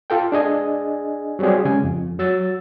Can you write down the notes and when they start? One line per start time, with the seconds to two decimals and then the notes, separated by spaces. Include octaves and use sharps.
0.10 F4 A4 G5
0.32 D4 G#4 D#5 G#5
1.39 F#3 G3 C4 G4 G#4
1.65 C#3 G#3 G#5
1.84 F2
2.19 F#3 E6 A6